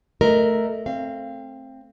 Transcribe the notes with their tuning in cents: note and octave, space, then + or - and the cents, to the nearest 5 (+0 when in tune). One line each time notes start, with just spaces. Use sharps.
A3 +0 A#4 +0 D#5 -15
C4 +15 F5 -25